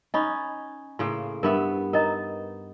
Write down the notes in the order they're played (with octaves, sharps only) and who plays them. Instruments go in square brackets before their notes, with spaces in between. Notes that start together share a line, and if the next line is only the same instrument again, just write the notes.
[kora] C#4 D#4 [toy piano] D#5 B5
[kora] A2 C#3 A#3 [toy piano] C6
[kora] G2 B3 E5 [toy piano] A#4
[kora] D#4 [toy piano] A#4 D#5 A#5